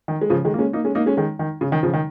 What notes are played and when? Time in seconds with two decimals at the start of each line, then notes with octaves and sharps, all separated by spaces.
0.08 D#3
0.21 G#3
0.30 C#3 F3
0.45 D#3 G#3
0.54 A#3
0.59 G#3 C#4
0.73 A#3 D#4
0.85 G#3 C#4
0.95 A#3 D#4
1.06 G#3 C#4
1.17 D#3 G#3
1.39 D#3
1.61 C#3
1.72 D#3
1.83 C#3 F3
1.94 D#3